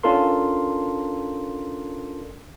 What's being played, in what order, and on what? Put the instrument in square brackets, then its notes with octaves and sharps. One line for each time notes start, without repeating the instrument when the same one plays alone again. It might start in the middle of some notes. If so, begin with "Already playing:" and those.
[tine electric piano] C#4 D4 F4 A4 A#4 C6